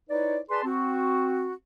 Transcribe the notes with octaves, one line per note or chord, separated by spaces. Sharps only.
D#4 E4 B4 C#5 D5
G#4 B4 D5 A5 C6
C4 F#4